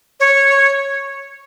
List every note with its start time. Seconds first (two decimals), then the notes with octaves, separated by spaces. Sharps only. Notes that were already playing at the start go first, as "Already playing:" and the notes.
0.20 C#5